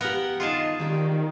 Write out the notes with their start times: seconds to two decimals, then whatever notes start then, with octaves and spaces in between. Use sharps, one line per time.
0.01 B3 G4 A#4 F5 F#5
0.40 D#3 D#4 F4 G#4 A5
0.80 D#3 C4 G4 D5